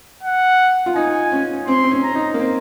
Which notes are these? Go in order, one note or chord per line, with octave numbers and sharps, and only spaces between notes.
F#5
F4
D#4 G#5
C#4
C4 C6
C4
C#4
A#5
D#4
A#3
C4